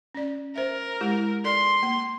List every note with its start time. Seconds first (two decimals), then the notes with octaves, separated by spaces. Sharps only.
0.14 C#4 D5
0.56 A#4 C5 E5
1.01 G#3 E4 G4
1.44 A4 D5 C6
1.83 A#3